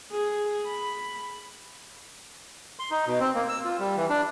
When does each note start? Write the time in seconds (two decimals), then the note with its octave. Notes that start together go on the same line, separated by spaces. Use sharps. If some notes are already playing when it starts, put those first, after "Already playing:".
0.12 G#4
0.66 B5
2.79 C6
2.91 D#4
3.07 B2
3.20 C4
3.35 A#3
3.49 E6
3.65 F4
3.79 G3
3.97 E3
4.10 D4